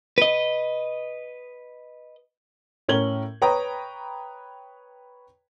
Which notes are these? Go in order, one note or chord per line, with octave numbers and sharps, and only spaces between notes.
B4 D#5
A2 C#4 A#4 G#6 F#7 G7
B4 C#5 G5 A#5 B5 D#6